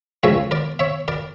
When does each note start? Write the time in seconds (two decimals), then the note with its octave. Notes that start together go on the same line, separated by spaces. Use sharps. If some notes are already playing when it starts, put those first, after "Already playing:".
0.23 C#2 C#3 F3 C#5 E5
0.51 A#4 D5
0.79 C#5 E5
1.08 A#4 D5